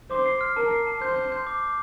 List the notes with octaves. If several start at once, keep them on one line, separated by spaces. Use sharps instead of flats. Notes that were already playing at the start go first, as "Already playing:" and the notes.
C5 D6
C7
F6
A#4 A5
C7
A5
C5 G6
G6
G6
D6
D6